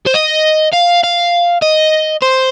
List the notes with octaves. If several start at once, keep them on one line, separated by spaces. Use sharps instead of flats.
C5
D#5
F5
F5
D#5
C5